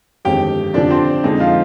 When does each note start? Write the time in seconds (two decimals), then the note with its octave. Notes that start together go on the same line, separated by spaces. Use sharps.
0.25 G1 F2 D#3 G#3 G4 G5
0.74 F2 D3 F3 D4 D5
0.90 C4 C5
1.24 F2 D3 G#3 C4 D#4
1.40 F3 F4